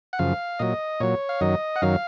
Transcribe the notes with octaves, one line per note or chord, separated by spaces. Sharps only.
F#5
F#2 C#3 F3 F5
A#2 F#3 D#5
A#2 F#3 C#5
F5
F#2 D#3 F#3 D#5
F#5
F#2 D#3 F#3 F5